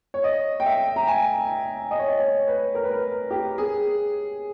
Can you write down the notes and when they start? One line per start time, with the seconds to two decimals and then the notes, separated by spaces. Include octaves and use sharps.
0.14 C#5
0.24 D#5
0.60 G5
0.66 E5
0.96 A#5
1.08 G#5
1.91 D#5
1.99 C#5
2.07 D#5
2.20 C#5
2.47 B4
2.75 A#4
2.84 B4
2.91 A#4
3.31 G4
3.58 G#4